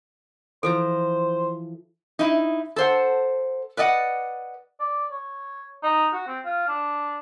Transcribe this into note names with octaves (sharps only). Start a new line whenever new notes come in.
E3 F3 A4 C5 A#5
D#4 E4
A4 C5 F#5
B4 D5 D#5 F#5
D5
C#5
D#4
F#4
C4
F4
D4